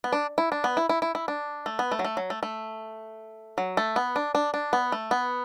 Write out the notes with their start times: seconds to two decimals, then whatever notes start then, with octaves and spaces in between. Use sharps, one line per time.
0.04 B3
0.13 D4
0.38 E4
0.52 D4
0.64 B3
0.77 E4
0.89 E4
1.02 E4
1.15 E4
1.28 D4
1.66 A3
1.79 B3
1.91 A3
1.99 F#3
2.04 A3
2.17 F#3
2.30 A3
2.43 A3
3.58 F#3
3.77 A3
3.96 B3
4.16 D4
4.35 D4
4.54 D4
4.73 B3
4.92 A3
5.11 B3